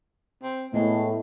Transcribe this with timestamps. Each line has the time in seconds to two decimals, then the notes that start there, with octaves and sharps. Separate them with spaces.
0.43 C4
0.74 A2 G#3 A3 B3 E4